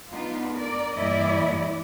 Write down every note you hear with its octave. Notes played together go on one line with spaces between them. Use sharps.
B3 D4 D#4 F4
A#4 D5
G2 A#2 E3 E4 D5 D#5